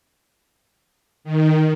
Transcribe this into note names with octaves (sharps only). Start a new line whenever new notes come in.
D#3